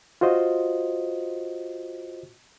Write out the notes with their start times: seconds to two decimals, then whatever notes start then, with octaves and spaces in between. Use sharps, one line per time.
0.21 F4 F#4 C5 D#5